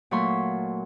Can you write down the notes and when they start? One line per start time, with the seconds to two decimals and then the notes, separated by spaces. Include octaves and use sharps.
0.11 A#2 F#3 A3 C#5 B5 C6